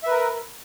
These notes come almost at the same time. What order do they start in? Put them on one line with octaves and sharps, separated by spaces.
E5 B4 A#4